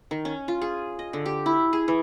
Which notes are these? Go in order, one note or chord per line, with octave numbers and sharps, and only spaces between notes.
D#3
C#4
F4
G#4
D#5
D3
G4
E4
G#4
E3